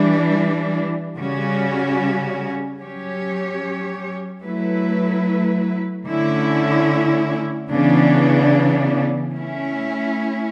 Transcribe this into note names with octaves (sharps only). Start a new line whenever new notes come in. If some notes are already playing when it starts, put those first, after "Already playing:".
Already playing: E3 G3 D4
C#3 G3 C#4 F#4
F#3 C#4 G4 C#5
F#3 A3 E4 B4
D3 A3 C#4 E4
C#3 E3 B3 D4
A3 C#4 E4